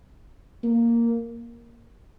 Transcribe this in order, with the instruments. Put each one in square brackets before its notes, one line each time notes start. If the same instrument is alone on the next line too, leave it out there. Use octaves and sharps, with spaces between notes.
[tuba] A#3